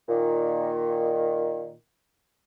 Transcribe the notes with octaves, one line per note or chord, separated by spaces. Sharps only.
A#2 D#3